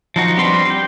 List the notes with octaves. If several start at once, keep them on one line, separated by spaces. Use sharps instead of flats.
F3 D#4 F#4
G3 C4 D4 B4 C6
G5